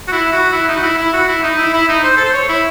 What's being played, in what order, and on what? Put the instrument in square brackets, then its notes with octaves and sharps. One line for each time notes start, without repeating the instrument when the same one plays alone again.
[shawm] F#4
E4
F#4
E4
D#4
F#4
E4
E4
F#4
E4
D#4
E4
E4
D#4
C5
A4
C5
C#5
E4